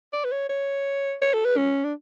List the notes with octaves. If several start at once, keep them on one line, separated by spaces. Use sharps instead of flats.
D5
B4
C#5
C#5
C#5
A4
B4
C#4
D4